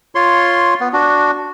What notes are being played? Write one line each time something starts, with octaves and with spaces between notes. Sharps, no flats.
F4 C#5 C6
B3
D4 F#4